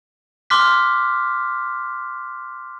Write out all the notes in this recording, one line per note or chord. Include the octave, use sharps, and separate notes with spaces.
C6 D6 F6 F#6 B6